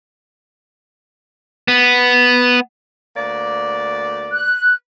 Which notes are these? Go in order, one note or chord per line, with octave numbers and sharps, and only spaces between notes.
B3
D2 A#3 D5
F#6